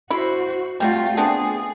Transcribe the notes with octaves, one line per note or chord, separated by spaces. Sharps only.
E4 F#4 C5 B5
G3 A3 C4 F4 F#4
B3 C4 D4 G#4